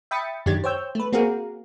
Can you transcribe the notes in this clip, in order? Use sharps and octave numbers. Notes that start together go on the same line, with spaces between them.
E5 G5 B5 D#6 A6 C#7
F#2 D#3 D4 G4 G#6 A6
C5 C#5 G5 E6 G6
A3 B4
A#3 C4 F#4 G#4 A#4 F5